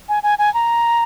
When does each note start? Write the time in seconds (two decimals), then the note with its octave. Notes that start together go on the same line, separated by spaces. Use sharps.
0.09 G#5
0.23 G#5
0.39 G#5
0.54 A#5